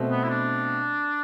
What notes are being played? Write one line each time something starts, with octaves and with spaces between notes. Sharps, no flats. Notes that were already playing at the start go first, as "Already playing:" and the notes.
Already playing: B2 A3 C4
B3
E4
D4